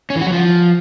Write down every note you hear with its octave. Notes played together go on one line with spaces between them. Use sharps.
C#4
E3
F#4
F#3
F3